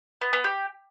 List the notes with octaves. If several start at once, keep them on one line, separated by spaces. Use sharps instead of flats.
B3
B3
G4